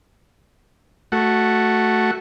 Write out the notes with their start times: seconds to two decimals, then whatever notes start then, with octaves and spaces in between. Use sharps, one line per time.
1.12 A3 F#4